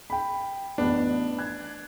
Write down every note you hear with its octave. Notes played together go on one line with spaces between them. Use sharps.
G5 B5
A1 B3 D4
F#6 G#6